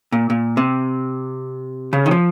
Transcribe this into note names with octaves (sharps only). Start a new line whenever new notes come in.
A#2
A#2
C3
C#3
D#3
F3